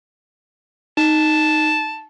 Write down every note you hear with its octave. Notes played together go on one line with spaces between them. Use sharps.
D#4 A5